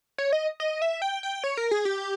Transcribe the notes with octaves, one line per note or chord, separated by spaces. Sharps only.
C#5
D#5
D#5
E5
G5
G5
C#5
A#4
G#4
G4